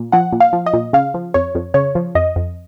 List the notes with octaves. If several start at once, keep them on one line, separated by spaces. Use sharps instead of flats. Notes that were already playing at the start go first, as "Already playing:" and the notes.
Already playing: A#2
F3 F#5
A#2
F5
F3
D#5
A#2
C#3 F5
F3
F2 C#5
F2
C#3 C#5
F3
F2 D#5
F2